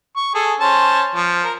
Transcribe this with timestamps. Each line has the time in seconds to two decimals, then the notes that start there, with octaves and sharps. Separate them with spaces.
0.17 C#6
0.35 G#4 A4
0.60 C#4 C5 A5
1.16 F3
1.44 A#4